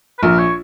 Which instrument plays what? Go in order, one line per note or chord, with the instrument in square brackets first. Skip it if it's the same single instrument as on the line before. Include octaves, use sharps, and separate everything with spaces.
[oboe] B4
[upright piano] A#1 [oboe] A#4
[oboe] C#5